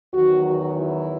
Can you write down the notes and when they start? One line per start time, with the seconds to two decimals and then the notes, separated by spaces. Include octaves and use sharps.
0.13 E2 D#3 F#3 F#4
0.45 F#4
0.75 E4